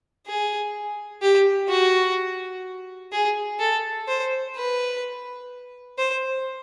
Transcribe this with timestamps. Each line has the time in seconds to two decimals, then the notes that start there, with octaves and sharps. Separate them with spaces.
0.27 G#4
1.22 G4
1.69 F#4
3.12 G#4
3.60 A4
4.08 C5
4.56 B4
5.98 C5